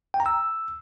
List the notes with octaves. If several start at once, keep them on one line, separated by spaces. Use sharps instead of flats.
G5
A#5
E6